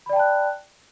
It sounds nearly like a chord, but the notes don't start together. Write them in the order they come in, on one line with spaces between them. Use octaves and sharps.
B5 D5 G5 A5 F#6